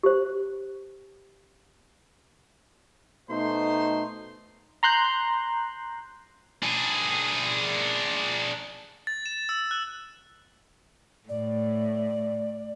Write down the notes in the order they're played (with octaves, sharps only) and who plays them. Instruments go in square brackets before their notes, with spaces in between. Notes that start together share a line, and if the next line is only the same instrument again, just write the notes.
[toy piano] G4 C5
[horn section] B2 A3 D#4 C5 C6
[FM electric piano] A#5 C6 F#6 G6
[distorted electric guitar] D4 G#4
[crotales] A6
E7
E6
F#6
[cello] A2 [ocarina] D5